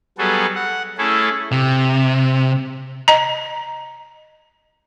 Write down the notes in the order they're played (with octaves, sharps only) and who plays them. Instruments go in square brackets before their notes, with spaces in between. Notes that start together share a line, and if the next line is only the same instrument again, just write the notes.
[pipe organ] F#3 G3 B3 F#4 G#4 A4
F#5
A3 C#4 E4 G#4 A4
[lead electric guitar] C3
[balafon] D#5 A#5